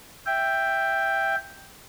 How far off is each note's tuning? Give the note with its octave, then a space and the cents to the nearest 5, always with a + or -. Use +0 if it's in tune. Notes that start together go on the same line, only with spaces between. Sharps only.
E5 +5 G5 +5